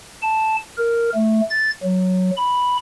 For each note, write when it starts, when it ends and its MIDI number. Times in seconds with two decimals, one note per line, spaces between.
0.22 0.56 81
0.78 1.10 70
1.15 1.41 57
1.50 1.70 93
1.83 2.31 54
2.37 2.77 83